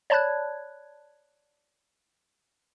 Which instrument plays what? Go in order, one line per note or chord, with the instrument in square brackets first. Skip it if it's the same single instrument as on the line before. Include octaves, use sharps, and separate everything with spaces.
[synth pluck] C#5 D5 A5 B5 F#6 G#6